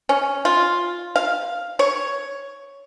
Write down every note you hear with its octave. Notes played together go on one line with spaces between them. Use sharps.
C#4
F4
F5
C#5